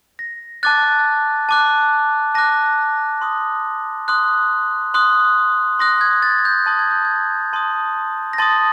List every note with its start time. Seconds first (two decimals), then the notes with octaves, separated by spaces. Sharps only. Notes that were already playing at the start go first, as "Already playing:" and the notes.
0.19 A#6
0.63 A5 D6 F#6 A6
1.49 A5 D6 F#6
2.35 A5 D6 F#6 A#6
3.21 C6 D#6 F#6
4.08 C6 D#6 F#6
4.94 C6 D#6 F#6
5.79 C6 D#6 F#6 A#6
6.01 G#6
6.22 A6
6.45 G6
6.66 A5 C6 D#6 A6
6.79 G#6
6.91 G6
7.05 G#6
7.53 A5 C6 D#6
8.33 A#6
8.38 A5 C6 D#6 A6